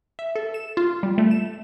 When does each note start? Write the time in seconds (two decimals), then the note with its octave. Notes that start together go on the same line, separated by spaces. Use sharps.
0.19 E5
0.35 A4
0.54 E7
0.77 F4
1.03 G3
1.18 A3
1.31 E7